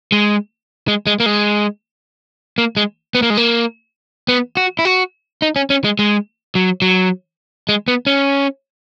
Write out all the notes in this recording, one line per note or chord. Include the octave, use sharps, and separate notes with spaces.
G#3
G#3
G#3
A#3
G#3
A#3
G#3
B3
A#3
G#3
A#3
B3
F#4
E4
F#4
D#4
C#4
C#4
G#3
G#3
F#3
F#3
G#3
B3
C#4